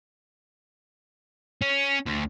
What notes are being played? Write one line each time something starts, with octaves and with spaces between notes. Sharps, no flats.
C#4
D2